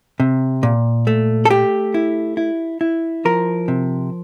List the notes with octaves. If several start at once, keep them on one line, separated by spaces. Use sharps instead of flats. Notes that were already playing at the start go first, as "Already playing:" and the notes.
C3
A#2
A3
A4
A3 G4
E4
E4
E4
F3 A#4
C3